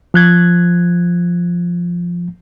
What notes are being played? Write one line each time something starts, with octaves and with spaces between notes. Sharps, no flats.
F3 F#6 G#6